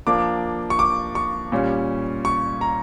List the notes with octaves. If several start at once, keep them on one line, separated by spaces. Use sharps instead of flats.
F3 A#3 D4 D6
C#6
D6
C#6
A#2 G3 C#4
C#6
A#5